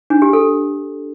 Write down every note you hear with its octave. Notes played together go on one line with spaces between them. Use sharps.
D4
G4
A4